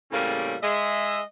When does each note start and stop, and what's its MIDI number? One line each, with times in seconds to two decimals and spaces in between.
0.12 0.55 45
0.12 0.55 49
0.12 0.55 55
0.12 0.55 58
0.12 0.55 60
0.12 0.55 67
0.62 1.20 56
0.62 1.20 75
0.62 1.20 76